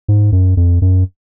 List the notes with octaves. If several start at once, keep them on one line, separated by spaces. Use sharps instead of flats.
G#2
F#2
F2
F#2